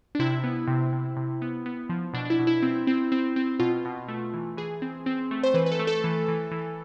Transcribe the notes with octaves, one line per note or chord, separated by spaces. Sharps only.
D4
C3 E4
B3
C3
C3
C3
B3
B3
F3
B2 D4
D4
E4
B2
E4
C4
C4
C4
C4
B2 F4
B2
A3
E3
E3 G#4
C4
C4
A3
C5
E3 B4
B4
A4
A3
A4
E3
E3
E3